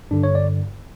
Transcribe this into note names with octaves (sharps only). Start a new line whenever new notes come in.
G2 D3 D4
C#5
D5